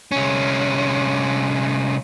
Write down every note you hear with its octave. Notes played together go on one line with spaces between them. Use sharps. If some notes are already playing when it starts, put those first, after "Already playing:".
C2 C#4